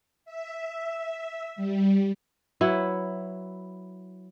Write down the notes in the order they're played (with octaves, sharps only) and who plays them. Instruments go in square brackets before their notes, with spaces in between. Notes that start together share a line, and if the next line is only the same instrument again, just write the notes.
[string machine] E5
G3
[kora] F#3 E4 B4